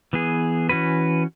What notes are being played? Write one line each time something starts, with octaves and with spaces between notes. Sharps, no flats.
E3 B3 G#4
E3 C#4 F#4 B4